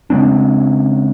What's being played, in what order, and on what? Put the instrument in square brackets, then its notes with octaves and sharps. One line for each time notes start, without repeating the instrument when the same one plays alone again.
[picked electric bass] C#3 G#3 C4 D4